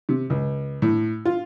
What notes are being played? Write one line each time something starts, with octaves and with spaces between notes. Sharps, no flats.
C3
C#2
A2
F4